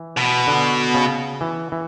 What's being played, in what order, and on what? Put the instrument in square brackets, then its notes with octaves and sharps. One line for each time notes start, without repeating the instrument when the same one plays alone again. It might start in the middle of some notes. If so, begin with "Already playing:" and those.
Already playing: [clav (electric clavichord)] E3
[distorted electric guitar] B2
[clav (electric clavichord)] D3
C#3
E3
E3